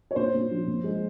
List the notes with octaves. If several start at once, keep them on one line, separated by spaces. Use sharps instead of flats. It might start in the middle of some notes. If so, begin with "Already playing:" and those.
C#5
A#2 C5
A#2
F3
A#2
G#3